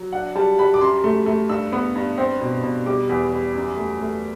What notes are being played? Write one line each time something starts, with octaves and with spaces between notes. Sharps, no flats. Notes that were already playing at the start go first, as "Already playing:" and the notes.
Already playing: F#3
D4 F#5
G3 A5
G3 B5
D6
F#2 C6
A3
A3
G2 E6
B3
G2
C4
B2
B2
G3 D6
E2
G3
F#2
A3
A3